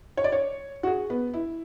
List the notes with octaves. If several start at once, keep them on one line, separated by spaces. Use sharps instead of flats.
C#5
D5
C#5
F#4
G#4
B3
E4